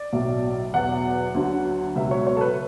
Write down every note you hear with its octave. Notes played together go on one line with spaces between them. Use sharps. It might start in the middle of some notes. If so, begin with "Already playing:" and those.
Already playing: D5
B1 A2 F#3
E2 B2 F#3 F#5
D2 D3 F#3
C#2 B2 F#3 E5
C#5
C#5
A4
B4